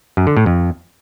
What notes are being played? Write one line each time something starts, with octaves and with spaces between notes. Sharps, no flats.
F#2
D3
A2
F2